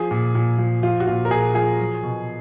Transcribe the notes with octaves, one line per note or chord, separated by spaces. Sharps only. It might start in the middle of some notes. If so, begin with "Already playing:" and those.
Already playing: F3 G#4
A#2
A#2
F3
F3 F4
F#4
A#2 F4
A#4
A#2 G#4
F3 G#4
F#3
B2